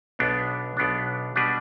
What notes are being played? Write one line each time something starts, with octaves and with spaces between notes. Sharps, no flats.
B1 B2 B3 D4
B1 B2 B3 D4
B2 G3 D4 B4